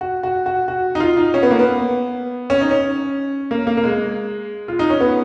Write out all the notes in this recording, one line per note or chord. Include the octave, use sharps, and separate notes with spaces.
F#4
F#4
F#4
F#4
D#4
F4
D#4
C#4
B3
A#3
B3
C#4
D#4
C#4
A#3
A#3
A#3
G#3
F4
D#4
C#4
B3